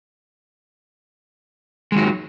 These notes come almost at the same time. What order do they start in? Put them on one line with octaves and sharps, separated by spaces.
G#3 D#3 F#3